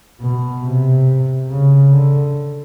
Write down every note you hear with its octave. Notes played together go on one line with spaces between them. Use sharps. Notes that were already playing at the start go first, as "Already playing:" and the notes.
B2
C3
C#3
D3